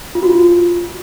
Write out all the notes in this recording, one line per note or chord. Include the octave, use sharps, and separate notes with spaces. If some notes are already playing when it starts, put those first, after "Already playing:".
F4
F#4
F4